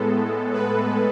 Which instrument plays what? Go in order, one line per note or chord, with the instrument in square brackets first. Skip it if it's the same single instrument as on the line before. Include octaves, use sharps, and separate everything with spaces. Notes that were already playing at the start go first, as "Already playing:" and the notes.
Already playing: [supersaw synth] A2 G#3 B3 A4
B4